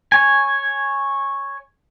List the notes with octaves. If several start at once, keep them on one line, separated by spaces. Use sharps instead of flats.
C#5 G#5